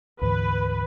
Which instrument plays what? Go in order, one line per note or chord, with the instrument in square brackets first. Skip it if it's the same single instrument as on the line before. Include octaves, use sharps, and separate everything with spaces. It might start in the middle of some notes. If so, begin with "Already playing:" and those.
[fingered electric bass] D2 G#2 E3 [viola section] B4